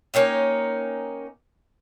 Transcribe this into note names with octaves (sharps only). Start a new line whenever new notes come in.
A#3 C#4 D#4 G5